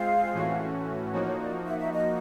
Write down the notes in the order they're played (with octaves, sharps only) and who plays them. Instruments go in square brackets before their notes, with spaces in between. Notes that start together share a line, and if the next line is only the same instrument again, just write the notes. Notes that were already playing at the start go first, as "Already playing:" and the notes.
Already playing: [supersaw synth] G#3 C4 F4 G#4 C5 [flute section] F5
[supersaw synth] A2 E3 A3 C#4 F#4
[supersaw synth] F3 A#3 D#4 F#4 [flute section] C#5
[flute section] C#5
D5
E5
E5
D#5